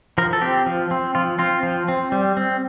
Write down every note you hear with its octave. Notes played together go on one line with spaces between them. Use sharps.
F3 A#4
A4
C4 G4
F3
C4
F3 F4
C4 F4
F3
C4
G3
C4